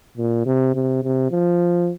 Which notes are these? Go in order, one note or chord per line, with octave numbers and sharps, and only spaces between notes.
A#2
C3
C3
C3
F3